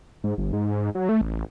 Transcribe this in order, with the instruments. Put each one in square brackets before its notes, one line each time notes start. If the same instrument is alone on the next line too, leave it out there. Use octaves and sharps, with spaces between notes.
[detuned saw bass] G#2
G1
G#2
F#3
A3
A1